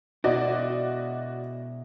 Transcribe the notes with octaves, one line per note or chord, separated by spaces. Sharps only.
B2 E4 F#4 D5 D#5